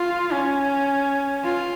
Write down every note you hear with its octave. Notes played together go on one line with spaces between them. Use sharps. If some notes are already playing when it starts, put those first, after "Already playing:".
Already playing: F4
C#4
F4